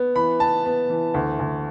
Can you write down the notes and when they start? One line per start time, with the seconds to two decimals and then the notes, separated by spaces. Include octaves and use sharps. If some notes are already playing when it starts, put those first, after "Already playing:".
Already playing: B3
0.16 E3 B5
0.40 B3 A5
0.65 B3
0.90 E3
1.14 D2
1.39 D2